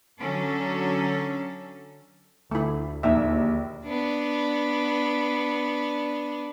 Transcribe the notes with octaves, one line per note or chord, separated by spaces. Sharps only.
D3 F#3 C#4 A4
D2 A3 E4
A#1 D#2 D#4 E5
B3 D4